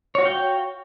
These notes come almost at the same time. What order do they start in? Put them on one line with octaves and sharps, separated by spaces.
C#5 F#4 F5 G5